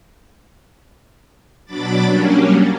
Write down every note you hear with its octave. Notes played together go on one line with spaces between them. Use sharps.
B2 F#3 D4 B5 D6 A6
F#3 G3 A#3 C#4 D4